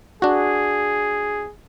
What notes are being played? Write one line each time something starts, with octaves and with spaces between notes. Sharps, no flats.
D4 F#4 G#4